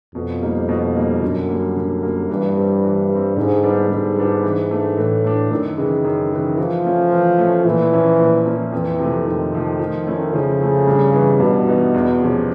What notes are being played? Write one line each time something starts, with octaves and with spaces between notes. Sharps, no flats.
F2 B2
G3 A#3 D#4
B2
G3 A#3 D#4
F#2 D3
G3 A#3
D3
G3 A#3
G2 E3
G3 C4
E3
G3
C4
G#2 D3
G3 B3 D4 G4
G#2 D3
G3 B3 D4 G4
E3
A3 D4
A2 E3
A3 D4
F#2 D#3
C#3 E3 G#3
F#2
C#3 E3 G#3
E3 F3
A3 C#4
E3
A3 C#4
A#2 E3
F3 A#3 C#4 E4
A#2
F3 A#3 C#4 E4
F2 E3
C3 F3 A3
F2 D#3
C3 F3 A3
F3
A3 C#4 E4
C#3 F3
A3 C#4 E4
G2
E3 G3 B3 D#4
G2 B2
E3 G3 B3 D#4
E2
C3 F3 G#3 C#4